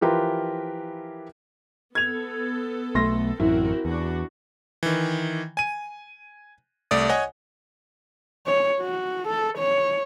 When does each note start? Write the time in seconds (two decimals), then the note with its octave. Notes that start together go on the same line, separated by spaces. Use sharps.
0.01 E3 F3 F4 G4 A#4 B4
1.95 B3 A4 G#6 F7
2.95 B1 A3 C6 A#6
3.40 A1 F#2 C4 E4 F#4 A#4
3.85 E2 D4 F#4
4.83 D#3 E3
5.57 G#5 D#7
6.91 C2 A3 D5 D#6
7.09 C#5 D#5 F#5 G#5
8.46 C#5
8.81 F#4
9.27 A4
9.58 C#5